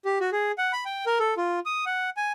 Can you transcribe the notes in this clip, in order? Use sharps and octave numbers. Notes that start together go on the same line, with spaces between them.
G4
F#4
G#4
F#5
B5
G5
A#4
A4
F4
D#6
F#5
G#5